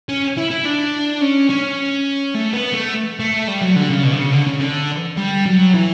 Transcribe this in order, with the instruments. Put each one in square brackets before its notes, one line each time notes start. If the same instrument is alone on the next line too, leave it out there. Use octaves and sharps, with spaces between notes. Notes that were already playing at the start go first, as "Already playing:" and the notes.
[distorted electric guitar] C#4
E4
E4
D4
C#4
C#4
A3
B3
A3
A3
G3
F#3
D3
C#3
B2
D3
C#3
D3
C#3
D3
G3
F#3
E3